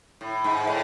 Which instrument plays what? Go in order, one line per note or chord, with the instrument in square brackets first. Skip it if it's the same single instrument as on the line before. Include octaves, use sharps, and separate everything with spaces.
[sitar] A2
G#2
A2